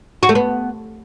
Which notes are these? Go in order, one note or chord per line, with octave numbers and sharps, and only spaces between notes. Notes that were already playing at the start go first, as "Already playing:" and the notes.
F#4
A3
B3